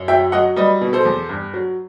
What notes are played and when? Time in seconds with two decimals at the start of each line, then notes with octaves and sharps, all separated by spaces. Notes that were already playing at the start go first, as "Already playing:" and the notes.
Already playing: F#2
0.08 F#3 E5 G5
0.32 F#3 D#5 F#5
0.56 G3 B4 D#5
0.81 B2
0.93 A4 C5
1.05 E2
1.29 G2
1.54 F#3